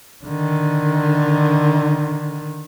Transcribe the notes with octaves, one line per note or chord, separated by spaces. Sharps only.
D3 D#3